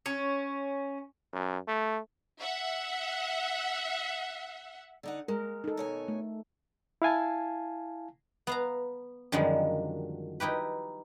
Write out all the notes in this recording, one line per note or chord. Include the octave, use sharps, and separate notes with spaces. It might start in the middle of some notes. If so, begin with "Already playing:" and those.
C#4
F#2
A3
E5 F#5
D3 D#4 F#5
G#3 A#4
D#4 A4
B2 C#5 G#5
A3
E4 F5 G#5 A5
B3 F5 A#5
F#2 D3 D#3 F3 G3 G#3
D#4 E4 G4 B4